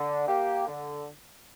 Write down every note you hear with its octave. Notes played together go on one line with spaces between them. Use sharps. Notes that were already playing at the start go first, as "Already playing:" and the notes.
Already playing: D3
A#3 G4
D3